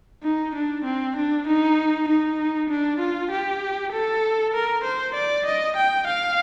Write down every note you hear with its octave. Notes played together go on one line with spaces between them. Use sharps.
D#4
D4
C4
D4
D#4
D#4
D4
F4
G4
A4
A#4
C5
D5
D#5
G5
F5